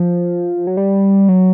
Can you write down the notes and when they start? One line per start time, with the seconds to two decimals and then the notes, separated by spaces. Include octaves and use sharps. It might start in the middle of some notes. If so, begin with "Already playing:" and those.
Already playing: F3
0.67 F#3
0.77 G3
1.29 F#3